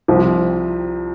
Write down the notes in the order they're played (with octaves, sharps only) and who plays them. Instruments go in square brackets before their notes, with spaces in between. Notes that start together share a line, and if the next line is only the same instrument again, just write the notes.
[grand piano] C2 C3 F3 C4